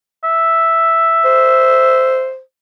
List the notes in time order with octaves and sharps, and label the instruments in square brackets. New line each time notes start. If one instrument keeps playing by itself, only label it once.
[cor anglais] E5
[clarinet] C5